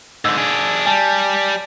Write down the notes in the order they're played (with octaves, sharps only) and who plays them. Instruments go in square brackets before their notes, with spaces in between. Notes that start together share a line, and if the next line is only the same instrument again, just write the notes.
[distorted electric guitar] G#2 D3 [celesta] E6
[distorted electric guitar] D4 G#4
[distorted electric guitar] G3 [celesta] G#5 A5